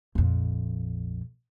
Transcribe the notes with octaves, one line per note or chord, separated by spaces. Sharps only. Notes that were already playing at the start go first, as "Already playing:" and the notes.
A#1 F2